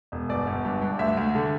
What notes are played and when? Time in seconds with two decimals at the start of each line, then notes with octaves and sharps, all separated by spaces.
0.12 E1
0.29 G1 D5
0.47 G1
0.65 G2
0.82 G2
0.99 D2 E5
1.17 D2
1.35 D3